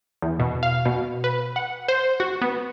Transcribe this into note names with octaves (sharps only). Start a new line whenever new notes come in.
E2
B2
F5
B2
B4
F#5
C5
F#4
B3